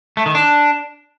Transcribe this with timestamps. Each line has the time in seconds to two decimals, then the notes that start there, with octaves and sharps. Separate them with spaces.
0.17 A3
0.26 D#3
0.35 D4